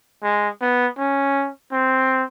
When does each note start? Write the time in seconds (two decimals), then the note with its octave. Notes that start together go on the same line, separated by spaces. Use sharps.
0.23 G#3
0.61 B3
0.98 C#4
1.72 C4